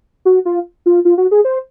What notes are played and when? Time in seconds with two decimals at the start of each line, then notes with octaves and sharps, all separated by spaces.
0.25 F#4
0.45 F4
0.86 F4
1.05 F4
1.18 F#4
1.31 G#4
1.45 C5